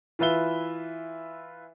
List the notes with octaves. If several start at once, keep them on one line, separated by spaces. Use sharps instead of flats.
E3 F4 B4 E5 G7